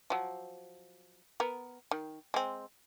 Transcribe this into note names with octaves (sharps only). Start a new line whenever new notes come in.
F3 F#3
B3 A#4
D#3
G#3 C4